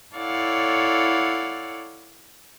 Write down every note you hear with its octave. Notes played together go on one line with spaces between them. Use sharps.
E4 A4 C#5 D5 F5 F#5